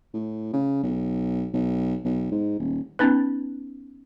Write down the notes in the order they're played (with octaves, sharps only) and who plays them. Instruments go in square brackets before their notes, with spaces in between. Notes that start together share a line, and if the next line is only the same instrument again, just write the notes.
[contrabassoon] A2
C#3
B1
B1
B1
G#2
D#1
[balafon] B3 C#4 D#4 B4